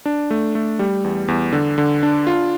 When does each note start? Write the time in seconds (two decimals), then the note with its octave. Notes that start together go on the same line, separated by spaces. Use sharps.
0.06 D4
0.31 A3
0.55 A3
0.79 G3
1.04 E2
1.28 E2
1.52 D3
1.78 D3
2.03 D4
2.27 F4